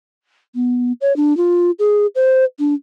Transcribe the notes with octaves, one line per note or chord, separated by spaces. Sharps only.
B3
C#5
D4
F4
G#4
C5
D4